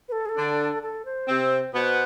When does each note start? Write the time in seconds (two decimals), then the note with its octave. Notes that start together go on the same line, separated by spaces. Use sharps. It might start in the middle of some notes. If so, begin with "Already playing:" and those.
0.09 B4
0.12 A4
0.26 G#4
0.29 A4
0.38 D3 D4
0.83 A4
1.05 C5
1.28 C3 C4
1.74 B2 B3 C5